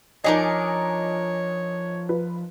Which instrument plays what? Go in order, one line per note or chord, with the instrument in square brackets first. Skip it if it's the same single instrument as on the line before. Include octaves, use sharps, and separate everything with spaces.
[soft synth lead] F3 [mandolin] D4 D#4 A#4 [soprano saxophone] C#5 [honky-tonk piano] D#5 G#5 D6
[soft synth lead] F3 [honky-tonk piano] F4 B4